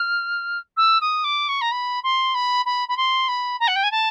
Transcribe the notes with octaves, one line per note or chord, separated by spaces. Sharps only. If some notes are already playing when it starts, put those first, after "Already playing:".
Already playing: F6
E6
D#6
D6
C#6
A#5
B5
C6
B5
B5
B5
C6
B5
A#5
F#5
G5
G#5
A5